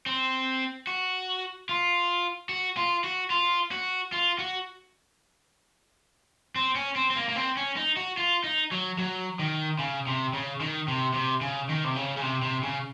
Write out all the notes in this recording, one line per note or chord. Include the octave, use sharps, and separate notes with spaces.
C4
F#4
F4
F#4
F4
F#4
F4
F#4
F4
F#4
C4
C#4
C4
C4
A#3
A#3
C4
C#4
D#4
F#4
F4
D#4
F#3
F#3
D#3
C#3
C3
C#3
D#3
C3
C3
C#3
D#3
C3
C#3
C#3
C3
C3
C#3